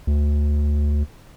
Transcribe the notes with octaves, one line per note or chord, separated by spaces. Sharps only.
D2